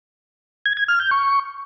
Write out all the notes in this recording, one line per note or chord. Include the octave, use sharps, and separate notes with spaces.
G#6
G#6
F6
G6
C#6